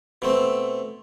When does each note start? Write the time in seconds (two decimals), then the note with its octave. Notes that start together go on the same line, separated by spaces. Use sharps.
0.22 B2 A3 C4